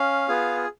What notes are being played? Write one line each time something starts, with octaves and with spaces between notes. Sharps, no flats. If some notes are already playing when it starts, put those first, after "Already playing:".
Already playing: C#4 F5
B3 F4 G#4